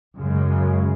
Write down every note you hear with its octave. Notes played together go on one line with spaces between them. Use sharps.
F#2 C#3 G#3